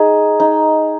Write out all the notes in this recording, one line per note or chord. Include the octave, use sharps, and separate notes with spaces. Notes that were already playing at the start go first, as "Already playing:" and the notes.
Already playing: D#4 G#4 D#5
D#4